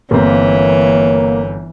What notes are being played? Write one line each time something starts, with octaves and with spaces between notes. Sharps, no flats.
G1 E3 A#3 C4 C#5